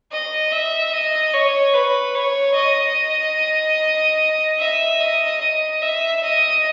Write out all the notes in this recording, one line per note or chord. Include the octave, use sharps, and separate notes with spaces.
D#5
E5
D#5
C#5
B4
C#5
D#5
E5
D#5
D#5
E5
D#5